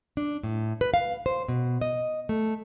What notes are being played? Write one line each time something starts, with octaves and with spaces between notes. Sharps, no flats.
D4
A2
B4
F5
C5
B2
D#5
A3